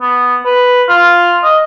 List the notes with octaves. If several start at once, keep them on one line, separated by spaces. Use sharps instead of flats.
B3
B4
F4
D#5